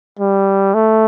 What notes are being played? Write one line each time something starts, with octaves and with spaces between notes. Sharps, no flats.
G3
A3